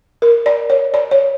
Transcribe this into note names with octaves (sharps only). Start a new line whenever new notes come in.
A#4
D5
C#5
D5
C#5